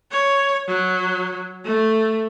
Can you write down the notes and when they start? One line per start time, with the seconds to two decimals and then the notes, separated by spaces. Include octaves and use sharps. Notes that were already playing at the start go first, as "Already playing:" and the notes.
0.11 C#5
0.68 F#3
1.65 A3